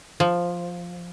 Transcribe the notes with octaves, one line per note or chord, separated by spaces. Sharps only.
F3